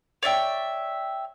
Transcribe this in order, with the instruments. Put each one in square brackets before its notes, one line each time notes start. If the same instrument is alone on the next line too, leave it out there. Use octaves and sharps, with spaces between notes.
[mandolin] C#5 D5 E5 G5